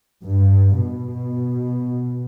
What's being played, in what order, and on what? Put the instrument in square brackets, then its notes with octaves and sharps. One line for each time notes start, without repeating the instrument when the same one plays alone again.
[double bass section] G2
B2